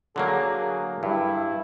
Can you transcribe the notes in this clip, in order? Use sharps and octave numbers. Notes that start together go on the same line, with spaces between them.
D3 F#3 A#3 G#4
G2 E4